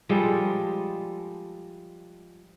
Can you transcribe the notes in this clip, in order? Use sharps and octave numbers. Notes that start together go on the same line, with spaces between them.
F3 G3 G#3 A4